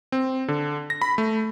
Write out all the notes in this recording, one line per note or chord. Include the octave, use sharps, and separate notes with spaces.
C4
D3
A#6
B5
A3